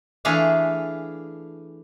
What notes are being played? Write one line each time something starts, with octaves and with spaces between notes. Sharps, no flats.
E3 A3 D4 G#4 E5 F5